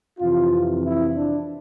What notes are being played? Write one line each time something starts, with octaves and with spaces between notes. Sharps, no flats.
F2 C3 E3 F4
E4
D4